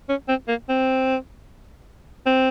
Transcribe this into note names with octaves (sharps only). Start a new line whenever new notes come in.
C#4
C4
A#3
C4
C4